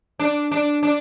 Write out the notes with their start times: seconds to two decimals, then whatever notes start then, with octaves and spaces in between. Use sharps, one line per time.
0.20 D4
0.52 D4
0.83 D4